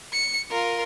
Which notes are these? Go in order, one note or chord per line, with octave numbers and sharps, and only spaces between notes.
C#7
F4 A#4